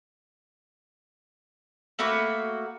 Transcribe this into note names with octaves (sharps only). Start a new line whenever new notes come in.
A3 A#3 F#4 B5